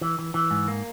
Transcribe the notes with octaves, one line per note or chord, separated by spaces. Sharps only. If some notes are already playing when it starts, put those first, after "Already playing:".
E3
E3
E3
G#2
A#3